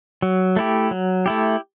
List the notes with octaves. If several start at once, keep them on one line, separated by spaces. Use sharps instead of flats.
F#3
A3 E4 G4
F#3
A3 E4 G4